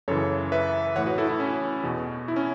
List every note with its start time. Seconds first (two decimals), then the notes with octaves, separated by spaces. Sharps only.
0.08 F#2 C#3 E3 A4 C#5
0.52 B4 E5
0.96 A2 E3 C#5 F#5
1.06 F#4 B4
1.18 E4 A4
1.28 E4
1.40 C#4
1.83 E2 B2
2.28 E4
2.36 C#4